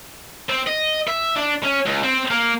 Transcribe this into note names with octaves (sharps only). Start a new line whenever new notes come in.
C4
D#5
E5
D4
C#4
C#2
C4
A#3